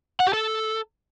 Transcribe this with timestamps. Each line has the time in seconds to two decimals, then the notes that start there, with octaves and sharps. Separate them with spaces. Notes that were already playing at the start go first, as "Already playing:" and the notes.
0.20 F#5
0.27 G4
0.33 A4